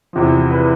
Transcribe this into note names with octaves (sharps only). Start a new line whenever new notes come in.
E2 C3 F3
B4